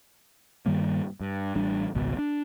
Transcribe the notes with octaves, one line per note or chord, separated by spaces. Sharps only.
G2 D#3 G3 A#3
G2
A1 G3 D4
G#1 C#2 B2
D4